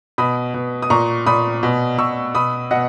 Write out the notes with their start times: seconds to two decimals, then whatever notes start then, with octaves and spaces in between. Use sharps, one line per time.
0.18 B2 B5 D#6
0.54 B2
0.82 D#6
0.90 A#2 A#5 C#6
1.26 A#2 B5 D#6
1.63 B2
1.98 B2 C#6 E6
2.34 B2 B5 D#6
2.71 B2 D#5 F#5